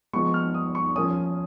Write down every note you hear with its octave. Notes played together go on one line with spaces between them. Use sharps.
F3 G#3 B3 C#6
F6
D#6
C#6
F3 A#3 C#4 D#6